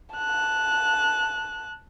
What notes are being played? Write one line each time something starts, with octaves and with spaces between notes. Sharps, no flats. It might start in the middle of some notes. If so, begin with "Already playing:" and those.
A5 F#6